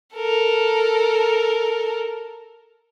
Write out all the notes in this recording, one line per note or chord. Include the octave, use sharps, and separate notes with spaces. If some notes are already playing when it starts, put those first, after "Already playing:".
A4 A#4